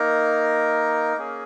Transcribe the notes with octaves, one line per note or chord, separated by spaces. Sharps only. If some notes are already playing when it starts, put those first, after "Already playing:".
Already playing: A#3 D#4 A#4
A#3 C#4 G#4